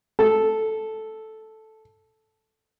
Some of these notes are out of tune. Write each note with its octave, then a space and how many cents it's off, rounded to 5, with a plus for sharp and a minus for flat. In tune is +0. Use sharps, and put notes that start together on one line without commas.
A4 -5